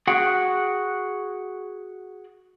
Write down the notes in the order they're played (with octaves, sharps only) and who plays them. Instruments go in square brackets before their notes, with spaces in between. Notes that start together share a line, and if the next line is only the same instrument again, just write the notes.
[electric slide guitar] F#4 G#4 F#5 G5